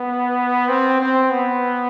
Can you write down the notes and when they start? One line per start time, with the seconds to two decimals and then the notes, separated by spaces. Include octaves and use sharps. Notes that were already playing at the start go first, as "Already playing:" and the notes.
Already playing: B3
0.69 C4
1.00 C4
1.30 B3